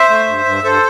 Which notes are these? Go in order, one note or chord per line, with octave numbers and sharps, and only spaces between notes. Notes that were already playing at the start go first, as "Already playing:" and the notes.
Already playing: C5 E5
A3
G2
G2
G2 A4 C5